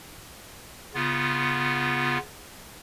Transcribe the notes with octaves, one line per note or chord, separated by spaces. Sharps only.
C#3 B3 F4